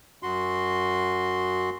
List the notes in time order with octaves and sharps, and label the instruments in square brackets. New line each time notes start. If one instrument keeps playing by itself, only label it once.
[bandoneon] F#2 F#4 C6